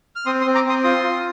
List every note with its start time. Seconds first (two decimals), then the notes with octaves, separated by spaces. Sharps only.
0.16 F6
0.26 C4 C6 D#6
0.41 C6 D#6
0.46 C4
0.55 A#5 D6
0.65 C4 C6 D#6
0.84 F4 C6 D#6
1.03 F4